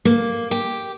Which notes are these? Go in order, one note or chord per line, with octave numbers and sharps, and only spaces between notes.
A#3
G4